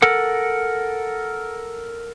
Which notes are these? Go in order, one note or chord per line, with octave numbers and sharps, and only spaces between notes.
A4 A#4 F#5